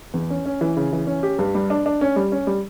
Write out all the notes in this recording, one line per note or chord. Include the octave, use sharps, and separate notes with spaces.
E2
C#4
C#4
E3
C#3
E3
C#4
G4
G2
G3
D4
D4
C#4
G3
C#4
G3